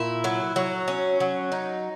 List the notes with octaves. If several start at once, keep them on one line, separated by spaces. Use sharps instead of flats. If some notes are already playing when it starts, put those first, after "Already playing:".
Already playing: A#2 E4
F#3
F#3
C#4
F#3
D#4